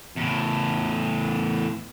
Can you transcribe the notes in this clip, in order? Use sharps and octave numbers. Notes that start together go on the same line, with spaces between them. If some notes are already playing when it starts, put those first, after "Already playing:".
E2 A2